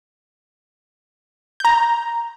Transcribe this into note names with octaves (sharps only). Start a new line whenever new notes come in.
A#5 G6